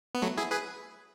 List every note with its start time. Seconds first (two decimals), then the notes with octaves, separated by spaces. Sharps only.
0.15 B3
0.22 F#3 A3
0.37 E4 G#4
0.51 G#4 B4